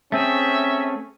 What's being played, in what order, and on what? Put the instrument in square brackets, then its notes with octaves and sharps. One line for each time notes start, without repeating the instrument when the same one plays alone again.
[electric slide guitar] A3 C4 G#4 [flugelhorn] C#4 [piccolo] E5